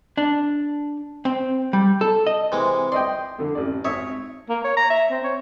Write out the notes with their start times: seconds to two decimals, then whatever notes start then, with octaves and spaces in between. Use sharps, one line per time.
0.17 D4
1.25 C4
1.73 G3
2.01 A4
2.27 D#5
2.52 C3 E3 G#3
2.92 D5 D#5 G5 C6
3.38 F2 D3
3.55 A1 D5
3.85 G#1 C#5 E5 D#6
4.49 A#3
4.64 C#5
4.77 A#5
4.90 E5
5.11 C4
5.24 C#5